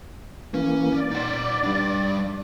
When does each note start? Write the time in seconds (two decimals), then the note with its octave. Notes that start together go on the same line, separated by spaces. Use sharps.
0.54 E3 A#3 C#4
0.92 D5
1.11 D#4 F#5
1.63 G3 D4